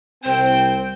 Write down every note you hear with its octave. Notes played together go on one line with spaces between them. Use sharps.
C2 C4 C5 G5